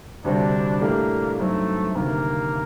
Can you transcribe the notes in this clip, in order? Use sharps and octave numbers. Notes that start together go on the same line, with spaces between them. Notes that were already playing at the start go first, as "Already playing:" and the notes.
D2 C3 G3 C4 D4 F#4
A2 A3 A#3 D4 G4
G2 F#3 A3 C4 D#4
D2 C3 D#3 A#3